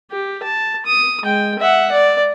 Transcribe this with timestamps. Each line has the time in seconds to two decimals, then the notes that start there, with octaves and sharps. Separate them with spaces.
0.11 G4
0.43 A5
0.86 D#6
1.23 G#3 G5
1.59 E5 F#5
1.91 D5